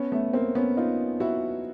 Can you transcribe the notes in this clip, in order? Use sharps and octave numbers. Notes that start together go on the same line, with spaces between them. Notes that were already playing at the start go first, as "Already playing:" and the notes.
Already playing: B3 C#4
A3 B3
A#3 C4
B3 C#4
D#4 F4
E4 F#4